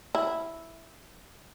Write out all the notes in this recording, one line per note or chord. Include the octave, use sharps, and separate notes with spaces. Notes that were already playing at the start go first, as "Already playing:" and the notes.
E4